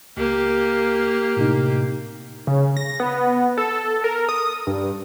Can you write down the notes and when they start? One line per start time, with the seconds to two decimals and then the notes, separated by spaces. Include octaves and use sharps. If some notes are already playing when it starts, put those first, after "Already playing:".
0.17 C#2 A#3 G4
1.37 A2 C3 D#4
2.47 C#3
2.77 A#6
3.00 B3
3.58 A4
4.04 A#4
4.29 D#6
4.67 G2